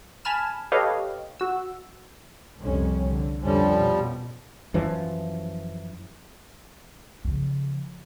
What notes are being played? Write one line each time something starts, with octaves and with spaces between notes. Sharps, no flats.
G#5 A5 B5 F6 E7
G4 A4 B4 C#5 D#5 F5
F#4 E6
C2 F2 C#4
D3
F2 D3 F3 G3 C#4
B2
F#2 E3 F3
C#3 F3